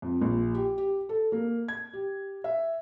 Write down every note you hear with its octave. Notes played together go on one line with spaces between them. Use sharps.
F2
A#1
G4
G4
A4
A#3
G#6
G4
E5